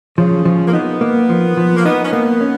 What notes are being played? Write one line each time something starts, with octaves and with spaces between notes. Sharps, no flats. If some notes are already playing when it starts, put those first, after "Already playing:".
C#3 F3
F3
A#3
B3 D#4
A#3
F3
F3
A#3
B3 D#4
C#4
A#3 B3
C#4